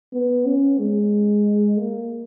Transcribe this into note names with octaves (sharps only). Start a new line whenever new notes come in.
B3
C#4
G#3
A#3